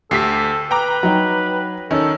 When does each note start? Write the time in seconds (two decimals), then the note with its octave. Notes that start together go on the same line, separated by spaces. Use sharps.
0.11 D2 G4 A4 B6 C7
0.71 B4 G5 A#5 D6
1.03 F#3 D#4
1.91 D#3 C#4 D#4 A4